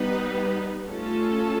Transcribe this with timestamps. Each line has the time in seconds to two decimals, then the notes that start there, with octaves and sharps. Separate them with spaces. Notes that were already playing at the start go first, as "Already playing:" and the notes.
Already playing: G3 B3 D#4 B4
0.88 A3 C#4 F4 A4